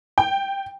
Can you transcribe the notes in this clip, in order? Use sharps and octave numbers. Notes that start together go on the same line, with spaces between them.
G5